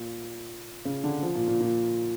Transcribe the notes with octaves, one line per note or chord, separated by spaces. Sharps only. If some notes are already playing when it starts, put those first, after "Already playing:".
Already playing: A#2
C#3
D3
F3
A#2
A#2
A#2